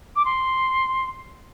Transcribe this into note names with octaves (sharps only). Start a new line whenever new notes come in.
D6
C6